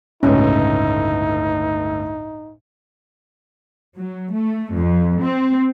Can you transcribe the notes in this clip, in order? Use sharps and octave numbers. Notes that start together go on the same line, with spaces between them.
G1 C#2 A2 C#4 D#4
F#3
A3
F2
C4